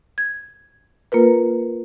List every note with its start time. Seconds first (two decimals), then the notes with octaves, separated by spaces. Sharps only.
0.18 G#6
1.12 A#3 F4 A#4 B4